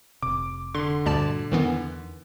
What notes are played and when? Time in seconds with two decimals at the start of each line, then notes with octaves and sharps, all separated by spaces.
0.23 F1 C3 D6
0.74 D3 C6
1.06 D2 G2 A#2 D5 A5
1.52 E2 D#3 E3 B3